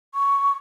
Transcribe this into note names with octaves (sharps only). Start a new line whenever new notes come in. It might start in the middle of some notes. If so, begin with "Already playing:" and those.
C#6